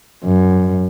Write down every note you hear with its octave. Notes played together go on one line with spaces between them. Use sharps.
F#2